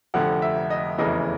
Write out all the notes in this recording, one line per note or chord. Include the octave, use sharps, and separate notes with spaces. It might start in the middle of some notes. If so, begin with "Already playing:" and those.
F1 F2 D3 F#5
E5
D#5
F1 E2 C#3 E3 D#5